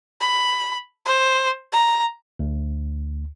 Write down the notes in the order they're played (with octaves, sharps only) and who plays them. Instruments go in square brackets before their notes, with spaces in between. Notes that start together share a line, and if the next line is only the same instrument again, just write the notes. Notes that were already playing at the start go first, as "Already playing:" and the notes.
[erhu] B5
C5
A#5
[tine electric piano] D2